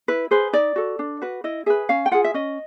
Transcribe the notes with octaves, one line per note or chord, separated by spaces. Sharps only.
E4 B4
G#4 B4 C5
D#4 D5
F#4 A4
D4
F#4 B4
E4 D#5
G#4 B4 E5
C#4 F5
G5
F4 G#4 F#5
E5
C#4 D#5